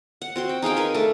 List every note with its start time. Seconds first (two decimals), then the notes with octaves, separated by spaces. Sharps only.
0.22 F#5
0.36 C4 F#4 C6
0.49 G5
0.62 D#4 G#4 F5 G5
0.76 A#4 B4 G#5
0.94 A3 D4